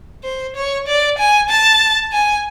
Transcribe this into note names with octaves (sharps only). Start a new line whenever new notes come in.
C5
C#5
D5
G#5
A5
G#5